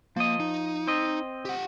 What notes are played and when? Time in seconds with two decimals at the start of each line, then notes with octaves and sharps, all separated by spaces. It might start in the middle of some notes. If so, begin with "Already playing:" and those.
0.16 F3 A#3 D#5
0.40 D#4
0.87 C4 D#5
1.45 G4 F#5